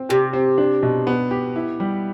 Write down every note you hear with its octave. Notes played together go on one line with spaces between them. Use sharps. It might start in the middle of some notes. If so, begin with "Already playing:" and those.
Already playing: C4
C3 G4
C4
D4
B2
B3
G4
E4
G3